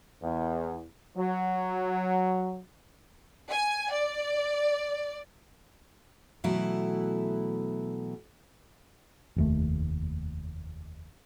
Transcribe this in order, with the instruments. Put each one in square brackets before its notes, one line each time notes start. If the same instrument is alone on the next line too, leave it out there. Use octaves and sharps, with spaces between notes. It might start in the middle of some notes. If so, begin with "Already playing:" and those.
[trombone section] E2
F#3
[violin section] G#5
D5
[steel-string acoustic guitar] B2 E3 F#3 A3 E4
[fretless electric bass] F1 D#2 A3